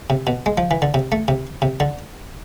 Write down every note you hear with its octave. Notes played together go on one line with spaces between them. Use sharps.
C3
B2
G#3
F3
E3
D3
C3
A3
C3
C3
D3